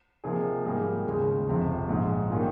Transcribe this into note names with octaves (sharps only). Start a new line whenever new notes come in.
C3 F3 A#3 D#4 G#4
G#2 G3 A#3 F4 G#4
D#2 C#3 G#3
G1 F2 C3 F3
A#1 G#2 F3 G#3 D#4
D#3 G3 A#3 C#4 F4